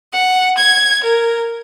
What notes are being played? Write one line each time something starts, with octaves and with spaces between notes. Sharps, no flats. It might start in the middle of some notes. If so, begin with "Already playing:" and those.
F#5
G#6
A#4